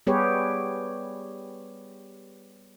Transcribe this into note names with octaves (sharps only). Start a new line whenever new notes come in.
G3 B3 G4 G#4 B4 C#5